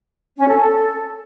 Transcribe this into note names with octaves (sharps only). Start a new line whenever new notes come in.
C#4
A4
A4